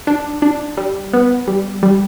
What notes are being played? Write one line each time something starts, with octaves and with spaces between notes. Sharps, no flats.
D4
D4
G3
B3
G3
G3